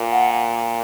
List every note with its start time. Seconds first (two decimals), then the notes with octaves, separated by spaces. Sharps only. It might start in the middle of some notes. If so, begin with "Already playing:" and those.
Already playing: A#2
0.11 F#5